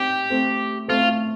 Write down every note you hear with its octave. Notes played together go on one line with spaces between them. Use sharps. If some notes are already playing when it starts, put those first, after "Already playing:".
Already playing: C4 D#4 G4
A3 C4
A3 C4 F4